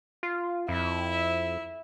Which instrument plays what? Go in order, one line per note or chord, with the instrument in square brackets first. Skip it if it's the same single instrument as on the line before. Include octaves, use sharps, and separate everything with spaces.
[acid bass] F4
[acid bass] F2 [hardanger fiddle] E4 E5